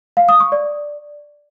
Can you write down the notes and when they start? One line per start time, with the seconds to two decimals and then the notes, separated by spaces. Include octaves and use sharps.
0.17 F5
0.29 D#6
0.40 C#6
0.52 D5